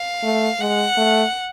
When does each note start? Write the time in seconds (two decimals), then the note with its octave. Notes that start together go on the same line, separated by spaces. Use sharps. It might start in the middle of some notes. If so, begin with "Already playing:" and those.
Already playing: F5
0.23 A3
0.60 G#3 F#5
0.97 A3